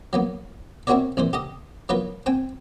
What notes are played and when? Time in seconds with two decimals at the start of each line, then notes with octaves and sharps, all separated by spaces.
0.13 F#3 A#3 B3
0.87 C4 E4 F#4 A#4 C#5 D5
1.17 C2 A#2 E3 C5
1.33 G4 A4 D#5
1.89 F#3 B3 F4 A#4 B4
2.26 C4 G5 G#5